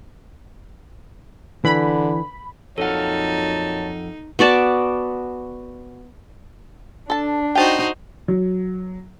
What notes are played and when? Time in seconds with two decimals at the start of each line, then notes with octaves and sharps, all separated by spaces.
1.65 D3 E3 B5
2.78 F2 A#2 F#3 D#4 A4 F5 F#5 A5
4.39 B3 F#4 D5 A5
7.10 D4 A4 A5
7.55 D#4 F#4 C5 G5 A5
8.28 F#3